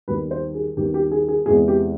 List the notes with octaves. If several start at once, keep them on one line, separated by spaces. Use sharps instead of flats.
D#2 D#3 G3 B3 B4
C5
G#4
D#2 D#3 G3 B3 G4
G4
G#4
G#4
E2 C3 E3 G#3 C4 G#4
G4